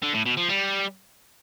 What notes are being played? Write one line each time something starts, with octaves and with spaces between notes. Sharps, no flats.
D3
A2
B2
F3
G3